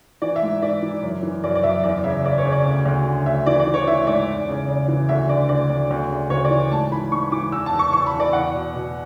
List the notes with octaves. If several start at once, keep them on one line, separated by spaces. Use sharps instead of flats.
E3 D5
E5
G#2
E3 D5
E3
F#2
E3
F#2 D5
D5
F#2 E5
E2 D5
C#3 E5
C#3 D5
C#5
C#3
D5
D2
D2
D3
D2 E5
E3 D5
D5
E3
C#5
E3 E5
G#2 D5
E2
C#3
C#3
E3
D2 E5
D3 D5
D3 D5
D2
D2
C#3
D2 C#5
D5
E3
G#2 A5
E3 B5
G#2 C#6
E3 D6
E2 E6
A5
E2
C#6
E2 C#6
B5
E2
D5
E2 F#5
B2
B2